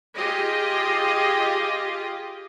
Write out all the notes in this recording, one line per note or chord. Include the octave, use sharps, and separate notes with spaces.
F4 G4 G#4 D#5